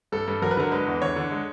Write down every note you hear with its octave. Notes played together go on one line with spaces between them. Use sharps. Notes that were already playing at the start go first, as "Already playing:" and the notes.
G2 A4
G2
F#3 A#4
B4
D3 A#4
G#3 B4
E2
D3 C#5
D3
G#3